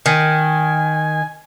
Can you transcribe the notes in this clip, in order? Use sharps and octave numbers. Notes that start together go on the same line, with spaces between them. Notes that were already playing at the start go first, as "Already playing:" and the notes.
D#3 G#5